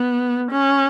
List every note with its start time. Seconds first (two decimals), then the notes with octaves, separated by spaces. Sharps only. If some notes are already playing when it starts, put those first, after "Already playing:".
Already playing: B3
0.51 C#4